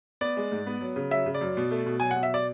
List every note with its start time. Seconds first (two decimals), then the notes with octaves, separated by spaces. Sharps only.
0.21 B3 D5
0.37 G#3
0.52 G#2
0.67 B3
0.81 F#3
0.96 C#3
1.11 F#3 E5
1.26 C#3
1.34 D5
1.41 F#2
1.57 B2
1.71 A3
1.86 B2
2.00 F#3 G#5
2.11 F#5
2.16 B2
2.23 E5
2.34 D5